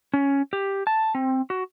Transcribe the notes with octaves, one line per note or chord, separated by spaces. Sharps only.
C#4
G4
A5
C4
F#4